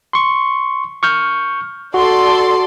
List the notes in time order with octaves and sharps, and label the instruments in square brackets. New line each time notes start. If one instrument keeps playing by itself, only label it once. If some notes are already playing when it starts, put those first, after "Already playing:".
[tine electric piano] C6 C#6
C#6 F6 G6
[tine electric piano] F#4 [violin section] A4 D5 C6